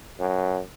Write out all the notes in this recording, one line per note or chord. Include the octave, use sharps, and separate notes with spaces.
F#2